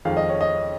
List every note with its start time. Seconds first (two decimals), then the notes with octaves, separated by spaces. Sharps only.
0.05 F2 D#3 G#3 F5
0.17 D#5
0.29 C#5
0.41 D#5